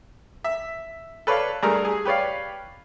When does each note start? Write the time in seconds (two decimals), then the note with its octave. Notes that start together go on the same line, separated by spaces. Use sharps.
0.44 E5
1.27 A4 B4 C#5 D5 F5
1.63 G2 G3 A3 G#4 A#4 A#5
1.85 G#4
2.05 G4 B4 C#5 D5 F5